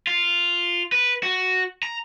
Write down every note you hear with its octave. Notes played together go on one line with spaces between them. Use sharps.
F4
B4
F#4
A#5